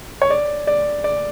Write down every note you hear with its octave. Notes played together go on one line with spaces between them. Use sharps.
C#5
D5
D5
D5